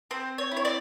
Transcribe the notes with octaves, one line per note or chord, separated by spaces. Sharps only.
C4 C5
C#5
E4
C#5
D5